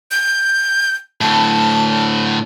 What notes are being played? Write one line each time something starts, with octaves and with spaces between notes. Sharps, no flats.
G6
A2 D3 A5